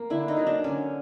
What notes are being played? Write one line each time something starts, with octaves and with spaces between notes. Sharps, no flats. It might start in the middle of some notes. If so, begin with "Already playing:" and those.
Already playing: A#3
D3 E4
D#4
F#3 A#3
D4
D3 C#4